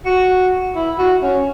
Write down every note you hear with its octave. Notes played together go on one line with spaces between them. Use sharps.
F#4
E4
F#4
C#4